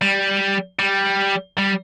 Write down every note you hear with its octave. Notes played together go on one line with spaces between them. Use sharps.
G3
G3
G3